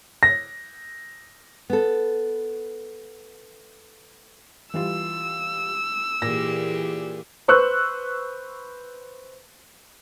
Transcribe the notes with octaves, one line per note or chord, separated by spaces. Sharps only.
A#6
B3 A4
E3 G3 F4 E6
A#2 E3 G4 G#4 A#6
B4 C5 C#6 E6 F#6